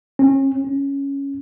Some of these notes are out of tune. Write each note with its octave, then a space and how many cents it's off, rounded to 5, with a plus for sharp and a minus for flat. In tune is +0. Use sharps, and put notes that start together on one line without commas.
C#4 -35
C#4 +0